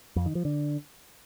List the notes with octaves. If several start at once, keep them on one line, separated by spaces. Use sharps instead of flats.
F2
D#3
F3
D3